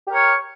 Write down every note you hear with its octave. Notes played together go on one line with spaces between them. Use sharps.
G4 A#4 C#5